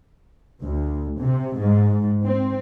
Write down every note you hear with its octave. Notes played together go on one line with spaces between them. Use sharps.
D2
C3
G#2
C4